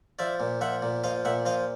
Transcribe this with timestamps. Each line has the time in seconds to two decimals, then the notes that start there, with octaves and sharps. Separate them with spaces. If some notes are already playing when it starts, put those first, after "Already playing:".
0.19 F3 D5 E5
0.40 A#2
0.61 F3 E5 F#5
0.82 A#2
1.04 F3 D#5 F5
1.25 A#2 E5 F#5
1.45 F3 D#5 F5